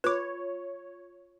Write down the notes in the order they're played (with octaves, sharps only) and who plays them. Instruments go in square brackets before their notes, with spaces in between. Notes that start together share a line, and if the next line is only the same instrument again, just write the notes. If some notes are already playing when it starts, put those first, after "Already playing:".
[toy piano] F4 [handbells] B4 D6 [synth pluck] C#5